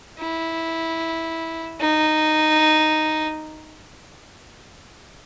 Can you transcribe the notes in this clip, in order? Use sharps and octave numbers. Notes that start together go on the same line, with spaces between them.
E4
D#4